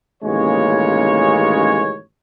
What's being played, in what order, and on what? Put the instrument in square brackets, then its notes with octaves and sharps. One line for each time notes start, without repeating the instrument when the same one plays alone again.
[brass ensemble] A1 D#2 C#3 G#3 A#3 C#5